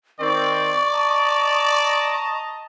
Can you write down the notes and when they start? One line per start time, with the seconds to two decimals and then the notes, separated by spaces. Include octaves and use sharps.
0.20 D#3 C4 D5 C#6
0.93 D#5 A5 A#5